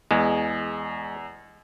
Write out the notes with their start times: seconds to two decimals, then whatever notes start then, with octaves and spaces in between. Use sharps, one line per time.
0.11 E2 G#3